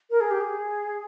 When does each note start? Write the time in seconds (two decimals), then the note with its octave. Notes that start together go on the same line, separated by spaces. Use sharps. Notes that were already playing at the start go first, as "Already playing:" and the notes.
0.10 A#4
0.20 G#4
0.31 G4
0.41 G#4